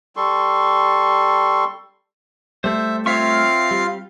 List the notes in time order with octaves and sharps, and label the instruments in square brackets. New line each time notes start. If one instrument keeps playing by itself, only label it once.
[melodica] G3 A4 C6 C#6
[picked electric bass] G3 A3 [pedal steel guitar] C5 [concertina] E5
[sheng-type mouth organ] C4 F5 [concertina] F4 F6 [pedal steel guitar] C#5 E5 C#6
[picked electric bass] G3